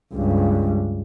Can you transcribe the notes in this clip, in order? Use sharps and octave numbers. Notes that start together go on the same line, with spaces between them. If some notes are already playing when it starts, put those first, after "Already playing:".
C#2 G2